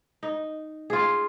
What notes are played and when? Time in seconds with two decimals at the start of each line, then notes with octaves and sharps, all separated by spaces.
0.23 D#4
0.90 F4 G#4